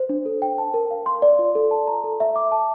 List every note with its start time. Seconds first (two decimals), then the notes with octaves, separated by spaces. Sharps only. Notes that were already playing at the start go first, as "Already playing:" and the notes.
Already playing: C5
0.09 D4
0.26 A4
0.42 G5
0.58 A5
0.74 A#4
0.91 F5
1.06 C6
1.22 D5
1.39 F4
1.55 A4
1.71 A5
1.87 A#5
2.04 A4
2.20 E5
2.36 D6
2.52 A5